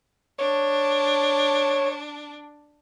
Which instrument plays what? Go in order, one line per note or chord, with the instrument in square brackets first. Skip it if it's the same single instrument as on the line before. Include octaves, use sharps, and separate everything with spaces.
[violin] D4 [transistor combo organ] C#5